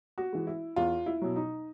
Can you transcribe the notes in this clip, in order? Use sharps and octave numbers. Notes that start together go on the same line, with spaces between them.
F#4
E3 G#3
E4
E2 F4
E4
B2 F#3
D#4